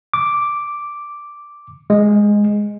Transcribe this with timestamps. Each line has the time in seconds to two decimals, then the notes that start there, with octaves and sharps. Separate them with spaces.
0.14 D6
1.90 G#3